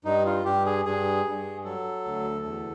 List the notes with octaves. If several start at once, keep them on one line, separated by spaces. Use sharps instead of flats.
G2 D#4
F4
G2 G4
G#4
G2 G#4
G2
F#3 A4
D2
E2